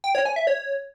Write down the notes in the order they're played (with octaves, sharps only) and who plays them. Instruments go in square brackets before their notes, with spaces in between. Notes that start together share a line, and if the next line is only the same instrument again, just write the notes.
[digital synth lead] G5
C#5
G#5
E5
C#5